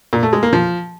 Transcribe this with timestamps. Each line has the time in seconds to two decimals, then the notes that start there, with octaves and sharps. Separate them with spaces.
0.13 A#2
0.23 A3
0.33 G#3
0.43 A#3
0.53 F3